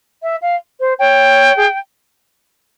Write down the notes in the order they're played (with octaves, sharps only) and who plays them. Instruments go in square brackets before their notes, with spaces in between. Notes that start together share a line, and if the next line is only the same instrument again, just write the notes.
[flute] E5
F5
C5
[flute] C#5 [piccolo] G5
[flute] G#4